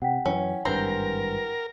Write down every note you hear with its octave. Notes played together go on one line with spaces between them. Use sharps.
C3 F#5 G5 B6
F#2 E3 C#4
G#1 G2 E3 A#4 C5 A#5